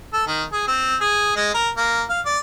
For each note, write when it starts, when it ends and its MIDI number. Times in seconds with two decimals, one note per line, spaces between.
0.13 0.27 69
0.27 0.43 51
0.52 0.65 68
0.67 0.96 60
1.01 1.33 68
1.36 1.53 56
1.54 1.69 70
1.77 2.02 58
2.09 2.20 77
2.26 2.39 74